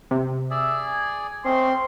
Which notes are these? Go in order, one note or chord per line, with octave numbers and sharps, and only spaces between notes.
C3
G#4 D5 E5
G#5
A3 C4 C#4 D#5 C6